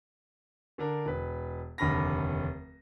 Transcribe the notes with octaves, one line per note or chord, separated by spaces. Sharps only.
D3 D4 A#4
E1 B4
F1 D#2 D3 B5 F6 A#6